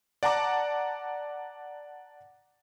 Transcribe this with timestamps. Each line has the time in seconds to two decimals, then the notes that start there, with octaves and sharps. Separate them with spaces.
0.23 D5 F#5 A5 A#5 D6